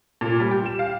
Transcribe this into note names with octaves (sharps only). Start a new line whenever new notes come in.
A#2
G3
G4
E7
F5